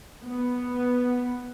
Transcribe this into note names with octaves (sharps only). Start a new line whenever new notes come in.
B3